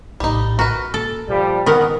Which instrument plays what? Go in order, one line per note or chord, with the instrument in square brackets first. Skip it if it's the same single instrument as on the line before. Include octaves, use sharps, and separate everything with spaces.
[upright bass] A#1 A2 [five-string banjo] G3 D#4
[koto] F#4 [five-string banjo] A#4 B4
[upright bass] A#3 [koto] A4
[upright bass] A#2 [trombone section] F3 G3
[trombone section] F2 G#2 B3 [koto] D#3 A#4 F#5 [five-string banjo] B5